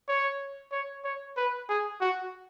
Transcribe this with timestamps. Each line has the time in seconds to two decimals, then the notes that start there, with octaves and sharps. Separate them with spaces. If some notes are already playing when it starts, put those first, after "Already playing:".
0.08 C#5
0.72 C#5
1.04 C#5
1.37 B4
1.69 G#4
2.01 F#4